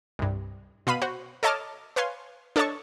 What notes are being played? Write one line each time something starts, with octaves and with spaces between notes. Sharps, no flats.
C2 G2
B2 F5 B5 D#7
F#4 C5
A4 C#5 D#5 A5 D6 F6
B4 C#5 F5 G#5 C6
D4 A4 C#5 D#5 A5 C#6